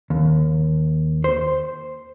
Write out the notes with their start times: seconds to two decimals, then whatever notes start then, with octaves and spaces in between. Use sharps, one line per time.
0.10 D#2
1.24 C5